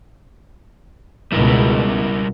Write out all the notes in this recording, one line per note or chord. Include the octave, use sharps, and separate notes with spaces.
C#2 B2 G3 E4 A#4